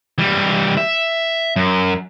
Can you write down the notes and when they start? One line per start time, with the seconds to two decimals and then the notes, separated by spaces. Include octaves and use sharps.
0.18 E3 G3
0.77 E5
1.56 F#2